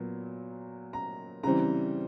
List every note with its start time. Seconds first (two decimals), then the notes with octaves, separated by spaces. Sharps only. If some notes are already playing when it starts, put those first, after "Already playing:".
Already playing: A#2 F#3 B3
0.93 A#5
1.43 C#3 E3 G3 C4 A#5